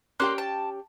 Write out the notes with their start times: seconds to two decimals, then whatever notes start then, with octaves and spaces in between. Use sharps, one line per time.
0.20 A#3 C#4 G4 G5 C6 F#6
0.38 A5